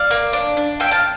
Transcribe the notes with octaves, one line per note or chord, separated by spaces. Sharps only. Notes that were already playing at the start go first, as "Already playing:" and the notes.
Already playing: D5 F5
A#3
D4
D4
A#3 E5 G5
F5 A5